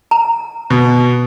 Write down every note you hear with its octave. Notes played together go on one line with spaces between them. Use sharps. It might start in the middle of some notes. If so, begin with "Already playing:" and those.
A#5
B2